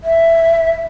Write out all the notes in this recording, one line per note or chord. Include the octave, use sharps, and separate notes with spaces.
E5